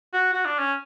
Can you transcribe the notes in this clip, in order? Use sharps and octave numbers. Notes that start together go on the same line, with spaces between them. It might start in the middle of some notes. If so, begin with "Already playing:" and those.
F#4
F#4
D4
C#4